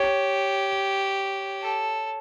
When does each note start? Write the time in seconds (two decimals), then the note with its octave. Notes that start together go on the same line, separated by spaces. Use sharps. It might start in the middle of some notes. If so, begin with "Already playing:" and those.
Already playing: G4 C#5
1.62 A4